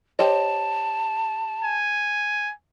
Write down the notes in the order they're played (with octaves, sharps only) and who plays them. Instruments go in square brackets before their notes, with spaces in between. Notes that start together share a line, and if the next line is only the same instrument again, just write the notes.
[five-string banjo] G4 C5 D#5 [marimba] C#5 [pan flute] A5
[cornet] G#5